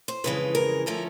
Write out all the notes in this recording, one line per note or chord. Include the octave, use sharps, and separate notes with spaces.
C5
F2 C#3 E3 G#3 B4
A#4
D3 F3 A3 C#4 A#4